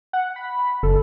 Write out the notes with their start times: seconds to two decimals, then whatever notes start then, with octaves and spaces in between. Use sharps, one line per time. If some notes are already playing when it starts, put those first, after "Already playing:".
0.13 F#5
0.36 B5
0.83 F#1 A4